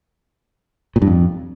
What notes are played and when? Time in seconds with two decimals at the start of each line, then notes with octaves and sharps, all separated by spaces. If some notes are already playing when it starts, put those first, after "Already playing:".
0.96 A#2
1.02 G2
1.07 F2